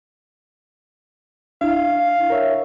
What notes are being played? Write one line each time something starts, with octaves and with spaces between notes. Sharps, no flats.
D4 E4 F5
A#4 C#5 E5